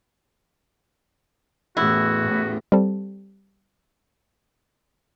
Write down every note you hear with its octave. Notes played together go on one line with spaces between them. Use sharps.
A1 E2 E4 F#4
A2
G3 C4 A4